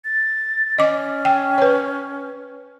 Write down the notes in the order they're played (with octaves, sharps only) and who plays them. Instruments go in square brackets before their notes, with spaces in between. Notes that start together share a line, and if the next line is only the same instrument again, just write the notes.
[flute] A6
[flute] C#4 [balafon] D#5 D6
[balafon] G5
B4 C#5